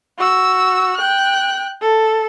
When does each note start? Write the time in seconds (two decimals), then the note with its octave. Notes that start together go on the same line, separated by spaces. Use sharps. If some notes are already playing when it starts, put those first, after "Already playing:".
0.19 F#4 E6
0.97 G5 F#6
1.82 A4